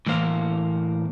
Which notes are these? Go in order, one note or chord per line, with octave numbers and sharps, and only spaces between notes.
A2 E3 A#3 C5 F5